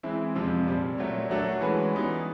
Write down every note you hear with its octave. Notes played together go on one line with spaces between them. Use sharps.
E3 G#3 C4 E4
F2 C3 F3 G#3 C4
A#2 G3 C4
A#2 F#3 A3
F#3 A3 D4 F#4 A4
E3 G#3 C#4 F#4 B4
E3 G3 B3 D#4